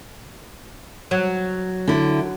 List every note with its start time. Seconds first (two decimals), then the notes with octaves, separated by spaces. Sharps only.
1.11 F#3
1.88 D3 E4